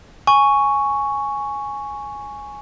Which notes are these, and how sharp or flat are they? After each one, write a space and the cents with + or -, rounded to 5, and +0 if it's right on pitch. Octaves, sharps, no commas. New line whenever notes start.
G#5 +0 C#6 +0